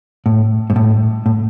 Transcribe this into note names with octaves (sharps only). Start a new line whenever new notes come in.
A2
G#2
A2
A2